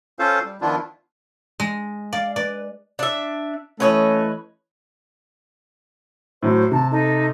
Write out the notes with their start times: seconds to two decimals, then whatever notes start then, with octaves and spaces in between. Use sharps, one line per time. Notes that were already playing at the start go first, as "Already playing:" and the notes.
0.19 C#4 F4 A4 C5 F5
0.44 G3
0.61 D#3 F3 B3 D4 E4 F4
1.60 G#3
2.13 D5 F5
2.36 B4 D5
2.99 D4 E5
3.80 E3 A3 C#4 B4 C#5 D#5
6.43 A2 F#3 A3 C5
6.72 C3 A5
6.91 D#4 A4